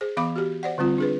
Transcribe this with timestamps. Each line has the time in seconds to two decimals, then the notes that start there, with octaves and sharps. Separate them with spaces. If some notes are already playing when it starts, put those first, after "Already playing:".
0.01 G#4 C5
0.17 E3 B3 F5 B5 D6
0.36 F#4 G4
0.63 C5 D5 F#5
0.78 D3 G3 C4 F4
0.98 D4 G#4 B4